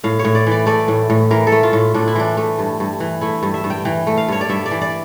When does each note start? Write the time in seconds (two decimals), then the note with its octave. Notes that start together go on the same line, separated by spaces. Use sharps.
0.04 A2 F5
0.19 C#5
0.25 A2
0.35 D5
0.47 E3 D5
0.66 A3 D5
0.88 A2
1.10 A2
1.31 E3 A#4
1.47 A4
1.52 A3
1.63 F4
1.73 A2
1.94 A2 D4
2.08 E4
2.15 E3 D4
2.37 A3
2.59 G2
2.80 G2
3.00 E3
3.21 A3 E4
3.43 G2
3.54 E5
3.64 G2
3.70 G5
3.85 E3 G5
4.07 A3
4.17 F5
4.28 G2 C#5
4.41 D5
4.50 G2 E5
4.66 D5
4.71 E3
4.82 D5